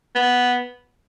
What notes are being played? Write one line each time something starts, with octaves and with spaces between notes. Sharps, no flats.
B3